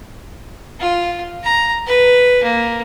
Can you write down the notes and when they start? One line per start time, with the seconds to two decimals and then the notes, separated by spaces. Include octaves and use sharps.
0.80 F4
1.44 A#5
1.87 B4
2.43 A#3